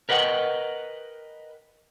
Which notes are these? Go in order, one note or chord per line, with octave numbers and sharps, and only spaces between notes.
A#4 B4 D#5 F#5 G5